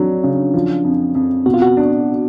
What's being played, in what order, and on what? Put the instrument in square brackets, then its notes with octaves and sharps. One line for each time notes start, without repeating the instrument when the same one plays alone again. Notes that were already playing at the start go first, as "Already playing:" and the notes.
Already playing: [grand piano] F2 F#3 [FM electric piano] D4
[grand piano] C#3
F3
F2
F2
[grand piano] B2 [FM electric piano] F#4
[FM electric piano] F4
F#4
[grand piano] D4